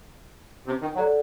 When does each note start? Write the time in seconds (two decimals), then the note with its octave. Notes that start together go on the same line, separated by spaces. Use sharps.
0.66 C3
0.81 D#3
0.95 F#3 A4 D5 F#5